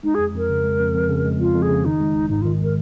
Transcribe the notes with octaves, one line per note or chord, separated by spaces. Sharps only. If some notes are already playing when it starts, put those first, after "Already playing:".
G#3 D#4
F2 G#4
F2 A#4
C#3
G#3
F2
F2
C#3
G#3
F2 F4
F2
G#4
C#3
D#3 D#4
G#3
G#1
G#2 D#4
D#3 F4
G#3 A#4